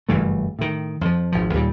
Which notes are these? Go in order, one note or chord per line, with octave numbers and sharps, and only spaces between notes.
F#1 G2 E3 A3
A2 D#3
F2 F3
G#1 F3
D#2 A#2 G3